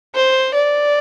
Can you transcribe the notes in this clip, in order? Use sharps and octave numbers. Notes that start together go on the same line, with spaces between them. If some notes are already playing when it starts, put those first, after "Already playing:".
C5
D5